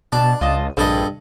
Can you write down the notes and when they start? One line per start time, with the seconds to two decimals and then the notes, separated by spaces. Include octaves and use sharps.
0.12 B2 D4 A5
0.41 C#2 F4 D#5 A5
0.77 A#1 G2 C4 G#4 A4 B4 D#5